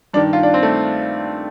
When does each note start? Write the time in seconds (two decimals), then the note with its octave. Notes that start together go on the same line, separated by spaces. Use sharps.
0.13 G2 D4
0.17 D#3
0.33 F4
0.43 D4
0.54 C4
0.63 A3